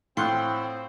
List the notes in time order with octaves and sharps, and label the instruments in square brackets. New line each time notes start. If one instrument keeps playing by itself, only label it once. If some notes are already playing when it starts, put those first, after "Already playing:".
[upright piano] A2 [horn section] C4 [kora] F4 C5 F#5 [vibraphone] G5